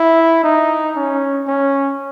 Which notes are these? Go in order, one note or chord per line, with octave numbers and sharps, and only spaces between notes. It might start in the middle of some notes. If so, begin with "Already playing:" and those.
Already playing: E4
D#4
C#4
C#4